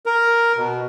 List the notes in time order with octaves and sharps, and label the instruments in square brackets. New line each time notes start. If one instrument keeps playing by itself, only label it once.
[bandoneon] A#4
B2